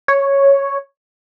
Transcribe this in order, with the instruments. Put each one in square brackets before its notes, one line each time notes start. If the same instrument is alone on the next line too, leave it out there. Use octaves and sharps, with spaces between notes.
[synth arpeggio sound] C#5